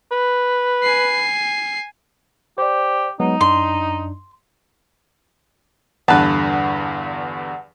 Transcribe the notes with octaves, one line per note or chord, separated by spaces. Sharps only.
B4
G#5 C7
G4 C5 D5
F#3 G#3 B3 D#4
F#2 D4 C6
E2 G2 D3 B4 F#5 A5